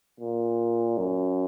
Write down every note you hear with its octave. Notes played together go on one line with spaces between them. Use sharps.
A#2
F#2